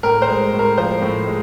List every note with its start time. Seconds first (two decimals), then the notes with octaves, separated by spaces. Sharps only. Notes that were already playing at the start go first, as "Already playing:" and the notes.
0.03 A2 A#4
0.22 C5
0.28 G#3
0.53 A2
0.59 A#4
0.77 F3 C5
1.02 A2
1.27 G#3